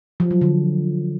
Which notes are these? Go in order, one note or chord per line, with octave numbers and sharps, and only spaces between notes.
F3
F#3
D3